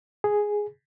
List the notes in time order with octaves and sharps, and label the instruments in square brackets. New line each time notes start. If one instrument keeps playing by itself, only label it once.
[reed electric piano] G#4